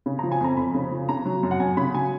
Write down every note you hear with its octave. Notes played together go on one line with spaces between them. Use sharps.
C#3
A#5
F3
G#5
F2 A#5
F2 B5
C#3
F3
C#3 A#5
F#3
F#2
F#5
F#2 G#5
C#3 B5
F#3 G#5